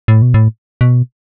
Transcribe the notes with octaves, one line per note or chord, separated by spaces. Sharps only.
A2
B2
A2
B2